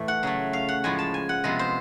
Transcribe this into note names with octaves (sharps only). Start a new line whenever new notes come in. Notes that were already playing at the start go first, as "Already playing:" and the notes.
Already playing: A2 E3 A3
F#5
C#3 F#3 A3
F5
F#5
A2 F3 G#3 G#5
A5
G#5
F#5
C3 F3 G#3 B3 D#5
C5